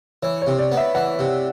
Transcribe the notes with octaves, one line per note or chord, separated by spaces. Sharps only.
E3 C#5
C3 C#5
D5
B3
E5
E3 F#5
C3